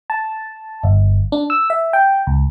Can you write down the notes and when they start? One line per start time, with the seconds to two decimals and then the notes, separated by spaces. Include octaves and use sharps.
0.10 A5
0.83 G1
1.32 D4
1.50 E6
1.70 E5
1.93 G5
2.27 C#2